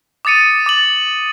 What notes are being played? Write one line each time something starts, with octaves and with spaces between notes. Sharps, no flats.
D6 D#6 A6 C#7 D#7
D6 A6 F#7